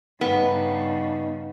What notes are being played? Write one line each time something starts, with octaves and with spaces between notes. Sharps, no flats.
G2 C#3 B3 D#4